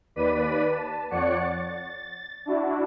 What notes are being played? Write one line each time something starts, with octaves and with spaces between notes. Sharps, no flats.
D#2 B4 D5 B6 D#7
A5
F2 C#5 D5 F#5 C#7
A6
D4 E4 F#4